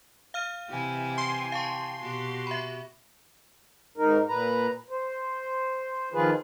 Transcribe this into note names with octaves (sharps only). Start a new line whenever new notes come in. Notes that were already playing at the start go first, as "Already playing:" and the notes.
F5 F6 D#7
C3 E3 E4 G4 G#5
C6
F5 A5 C#6
B2 B3 F#4 G4
E5 B5
G#2 D#4 A#4
A#2 B4 A#5
C5
D#3 F3 F4 G#4 B4